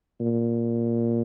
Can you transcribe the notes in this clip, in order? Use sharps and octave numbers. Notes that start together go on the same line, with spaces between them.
A#2